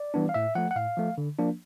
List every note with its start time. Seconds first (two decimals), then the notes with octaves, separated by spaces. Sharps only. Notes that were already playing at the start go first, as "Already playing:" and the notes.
Already playing: D5
0.14 E3 G3 B3 D4
0.29 F5
0.34 A2 E5
0.55 F3 A3 F#5
0.71 F#5
0.76 A2 F5
0.97 F3 A3
1.18 D3
1.38 F3 A#3 D4